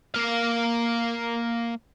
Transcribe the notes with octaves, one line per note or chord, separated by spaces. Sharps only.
A#3 F5